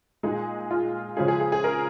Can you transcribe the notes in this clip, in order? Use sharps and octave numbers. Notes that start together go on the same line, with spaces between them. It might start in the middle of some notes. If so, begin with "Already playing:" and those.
A#2 G#3 D#4 G#4
F4
C#3 F3 G#3 C#4 G#4
G#4
G#4
G#4
A#4